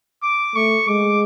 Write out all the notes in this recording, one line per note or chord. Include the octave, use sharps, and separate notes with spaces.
D6
A3 C#6
G#3 D6